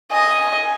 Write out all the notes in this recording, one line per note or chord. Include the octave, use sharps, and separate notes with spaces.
D#5 G#5